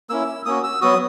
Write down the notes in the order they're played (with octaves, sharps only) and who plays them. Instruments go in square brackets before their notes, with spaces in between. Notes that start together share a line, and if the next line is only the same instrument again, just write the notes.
[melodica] A#3 C#4 E4 E6
A#3 C#4 F#4 D#6
E6
F#3 B3 F#4 D#6